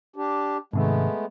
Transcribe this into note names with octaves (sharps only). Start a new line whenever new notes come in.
D4 G4
G#2 C3 D#3 G#3 A3 B3